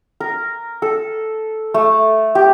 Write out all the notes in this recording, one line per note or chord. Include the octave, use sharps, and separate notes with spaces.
A#4
A4
A3
G4